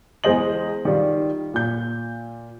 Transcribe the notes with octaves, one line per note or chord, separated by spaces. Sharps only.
E2 G#3 C5 D#5 F#7
D#3 G3 F4
A#2 G6